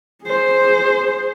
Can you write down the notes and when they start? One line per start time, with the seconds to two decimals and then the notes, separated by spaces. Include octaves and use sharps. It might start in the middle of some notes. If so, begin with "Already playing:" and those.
0.24 G#4 C5